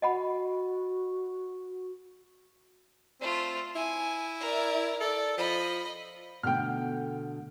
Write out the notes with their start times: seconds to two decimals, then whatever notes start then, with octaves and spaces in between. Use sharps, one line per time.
0.02 F#4 D#5 F#5 B5
3.21 A3 C4 F4
3.75 E4 G#5
4.40 A#4 D5
5.01 A4 D5
5.37 F3 D#5 B5
6.43 B2 D3 A3 G5 F6